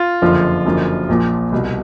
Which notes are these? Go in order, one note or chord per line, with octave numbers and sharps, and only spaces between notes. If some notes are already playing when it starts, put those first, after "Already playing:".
Already playing: F4
F#1 F2 D3 F3
F#1 F#2 D3 F3
A#1 A#2 F3
C2 B2